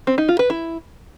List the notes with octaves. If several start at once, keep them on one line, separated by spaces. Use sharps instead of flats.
C4
D#4
F4
B4
E4